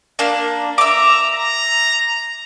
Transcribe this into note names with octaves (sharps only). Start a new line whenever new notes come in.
A#3 D4
E5 A#5 D6
A#5